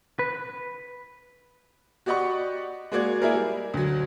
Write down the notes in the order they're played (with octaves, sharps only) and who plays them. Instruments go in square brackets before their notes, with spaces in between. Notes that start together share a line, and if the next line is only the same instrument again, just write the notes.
[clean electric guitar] B4
[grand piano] F#4 G4 D5 D#5 F#5 C#6
G#3 A#3 F#4 D5 G#6
A#3 E4 G#4 A#4
G3
D2 F#3